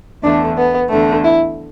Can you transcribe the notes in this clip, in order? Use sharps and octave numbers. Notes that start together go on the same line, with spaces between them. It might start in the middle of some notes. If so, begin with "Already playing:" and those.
E2 D3 A3 D4
B3
E2 D3 A3
E4